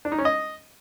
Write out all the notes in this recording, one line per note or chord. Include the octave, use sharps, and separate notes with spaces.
D4
D#4
C#4
D#5